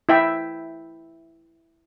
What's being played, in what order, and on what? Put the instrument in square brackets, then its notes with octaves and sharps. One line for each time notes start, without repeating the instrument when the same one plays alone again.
[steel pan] E4 E5 G5